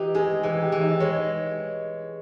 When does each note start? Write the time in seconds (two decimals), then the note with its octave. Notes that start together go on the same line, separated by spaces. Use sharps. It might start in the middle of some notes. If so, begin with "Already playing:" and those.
Already playing: E3 D#4 G4 G5
0.15 G#3 G#4 G#5
0.43 E3 G#4 G#5
0.62 G4 G5
0.72 E3
0.81 D#4 D#5
1.00 G#3 C#5